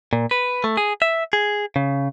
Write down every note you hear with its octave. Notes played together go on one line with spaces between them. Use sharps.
A#2
B4
A3
G#4
E5
G#4
C#3